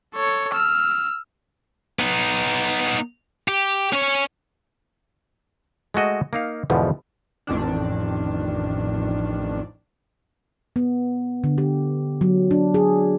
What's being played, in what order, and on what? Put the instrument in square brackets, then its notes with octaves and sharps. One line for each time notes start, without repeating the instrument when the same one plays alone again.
[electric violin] A4 C#5
E6 F6
[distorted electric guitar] B3 D#4
G4
C#4 C#5
[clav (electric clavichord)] G#3 A3 F#4 D#5
A#3 D#4 F5
E2 G#2 B2 D3 F3
[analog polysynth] A1 F2 D#3 D4
[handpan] B3
D3
G4
F#3
D4
G#4